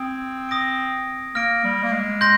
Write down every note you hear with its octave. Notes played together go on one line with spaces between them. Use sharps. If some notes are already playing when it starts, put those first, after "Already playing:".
Already playing: C4 D#6 G#6 D7
D#6 A#6 D7
A#3 F6 A#6 D7
G3
A#3
G#3
C6 G6 A#6